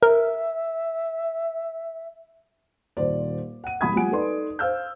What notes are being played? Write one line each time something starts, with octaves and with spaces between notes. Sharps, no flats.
A#4 E5
D#1 C5 D5
F#5 D#7
E1 G3 B5 D#6 G#6
F3 G3 A3 F#5 G#5 D7
D#4 A4 B4 D5 C6
C5 F5 E6 F6 G6